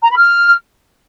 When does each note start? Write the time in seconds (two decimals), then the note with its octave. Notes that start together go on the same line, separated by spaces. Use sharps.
0.03 A#5
0.10 B5
0.17 F6